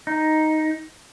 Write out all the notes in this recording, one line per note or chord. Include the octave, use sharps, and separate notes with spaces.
D#4